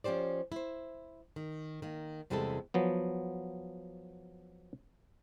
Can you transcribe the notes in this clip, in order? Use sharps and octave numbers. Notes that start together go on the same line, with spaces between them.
F3 C#4 G4 C5 D5
E4 C5
D#3
D#3 A#3
E2 C3 G3 G#3 E4 A4
F3 F#3 B3